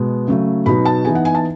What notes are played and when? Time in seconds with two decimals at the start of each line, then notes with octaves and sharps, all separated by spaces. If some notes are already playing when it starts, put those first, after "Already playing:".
Already playing: B2 G#3 B3
0.28 C#3 F#3 A3
0.66 B2 F#3 B3 D#4 B5
0.85 A5
1.05 E3 B3 D#4 G#5
1.15 F#5
1.25 G#5
1.35 A5